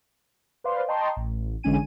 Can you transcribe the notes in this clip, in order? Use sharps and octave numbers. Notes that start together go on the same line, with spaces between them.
B4 C5 D5 F5 C6
D#5 G5 A5 A#5 C6 C#6
A1
A1 D3 G#3 C#4 G#5 D#7